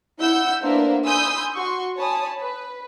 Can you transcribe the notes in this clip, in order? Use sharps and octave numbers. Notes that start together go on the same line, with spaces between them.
E4 F#5 E6 G6
A#3 B3 D4 C5 E5
G#5 B5 C6 D#6 E6 G6
F#4 C6 C#6
C#5 G#5 A5 B5 D#6
B4